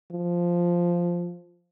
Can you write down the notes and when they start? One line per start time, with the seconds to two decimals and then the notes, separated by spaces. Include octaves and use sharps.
0.12 F3